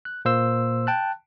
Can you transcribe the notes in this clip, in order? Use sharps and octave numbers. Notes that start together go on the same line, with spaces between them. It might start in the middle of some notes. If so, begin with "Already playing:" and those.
F#6
A#2 A#3 C5 C6 E6
G5 A5 F#6